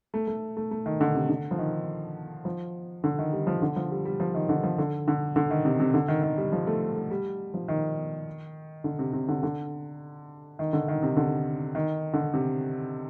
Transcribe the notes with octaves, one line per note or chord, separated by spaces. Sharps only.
A3
A3
A3
A3
D#3
D3
C3
D3
F3
D#3
F3
D3
D#3
G3
F3
D3
F3
G3
G3
F3
D#3
D3
F3
D3
D3
D3
D#3
C3
C3
D3
D#3
D#3
G3
F3
A3
A3
G3
F3
D#3
D3
C3
C3
D3
D3
D#3
D3
D#3
C3
D3
D#3
D3
C3